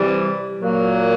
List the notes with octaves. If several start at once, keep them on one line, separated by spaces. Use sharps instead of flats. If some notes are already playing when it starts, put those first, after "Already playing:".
Already playing: C3 E3 G3
A#2 F#3 A#3